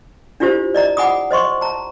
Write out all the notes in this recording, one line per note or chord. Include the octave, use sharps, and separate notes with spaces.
D4 E4 F4 G4 C5
D5 D#5 A#5
F#5 G#5 B5 D6 D#6
C5 D#5 C6 C#6
A5 A#5